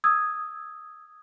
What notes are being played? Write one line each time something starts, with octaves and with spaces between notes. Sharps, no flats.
D#6 E6 G#6